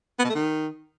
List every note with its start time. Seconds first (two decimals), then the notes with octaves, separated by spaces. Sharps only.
0.19 B3
0.25 B2
0.30 A3
0.35 D#3